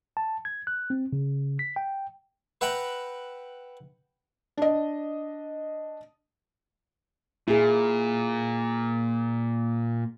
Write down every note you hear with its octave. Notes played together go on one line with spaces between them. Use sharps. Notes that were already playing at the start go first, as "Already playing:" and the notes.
A5
G#6
F#6
C4
C#3
B6
G5
B4 E5 F#5 G5 A#5 B5
D4 D#5
A#2 E4 G#4